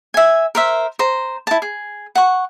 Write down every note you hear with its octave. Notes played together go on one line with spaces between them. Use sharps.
E5 G#5
A#4 C5 E5
C5 A#5
E4 A5
G#4
F#5 C#6